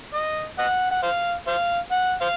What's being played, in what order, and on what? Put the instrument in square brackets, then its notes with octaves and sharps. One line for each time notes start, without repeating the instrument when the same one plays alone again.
[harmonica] D#5
D#5 F#5
F#5
C5 F5
C5 F5
F#5
C5 F5